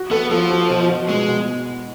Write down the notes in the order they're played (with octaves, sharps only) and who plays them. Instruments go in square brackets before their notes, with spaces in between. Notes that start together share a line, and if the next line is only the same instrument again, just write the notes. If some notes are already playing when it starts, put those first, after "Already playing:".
Already playing: [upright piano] F#4
[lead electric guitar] B3 [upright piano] A4
[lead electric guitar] F3 [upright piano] A4
[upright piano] F#4
B2
B2
[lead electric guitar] G#3 [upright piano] B3
[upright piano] B2